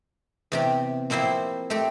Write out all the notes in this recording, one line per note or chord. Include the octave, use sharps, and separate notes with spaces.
E2 C3 G4
F3 A#3 C4 E4 C5
A3 C4 G4